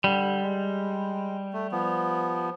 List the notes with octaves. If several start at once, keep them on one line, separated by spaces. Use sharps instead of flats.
D3 G3
G#3
A3
F3 B3